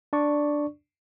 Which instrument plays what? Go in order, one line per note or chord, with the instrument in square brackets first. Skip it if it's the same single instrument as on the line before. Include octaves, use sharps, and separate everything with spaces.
[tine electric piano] D4 D5 C#6